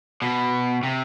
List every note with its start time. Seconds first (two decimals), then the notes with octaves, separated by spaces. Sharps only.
0.22 B2
0.83 C3